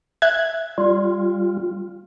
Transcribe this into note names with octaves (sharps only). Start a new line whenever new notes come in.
E5 F#6 G#6
G3 F4